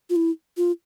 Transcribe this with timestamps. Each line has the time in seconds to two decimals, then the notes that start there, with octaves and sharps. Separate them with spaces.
0.10 F4
0.16 E4
0.57 F4